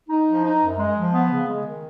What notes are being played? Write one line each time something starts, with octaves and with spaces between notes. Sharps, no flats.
D#4
F3
D#4
F#2
G#3
F3
B3
C#3
G#3
D#3